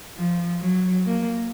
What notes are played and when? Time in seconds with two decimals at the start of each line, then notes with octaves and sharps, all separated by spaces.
0.17 F3
0.61 F#3
1.06 A#3